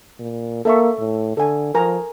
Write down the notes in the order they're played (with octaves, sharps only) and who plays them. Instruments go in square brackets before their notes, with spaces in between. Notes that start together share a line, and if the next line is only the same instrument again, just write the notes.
[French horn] A#2
[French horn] A#3 [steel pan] A4 E5 C#6
[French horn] A2
[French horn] D3 [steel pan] A4 G#5
[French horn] F3 [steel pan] A#4 G#5 A#5